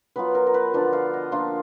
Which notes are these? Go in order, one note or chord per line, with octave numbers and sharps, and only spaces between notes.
F#3 B3 F4 B4
A#4
A#4
B4
D3 F3 B3 F4 D5
F5
D#5
F3 A#3 D4 F4 F5